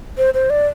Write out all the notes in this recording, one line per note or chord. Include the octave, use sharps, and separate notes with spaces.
C5
C5
D5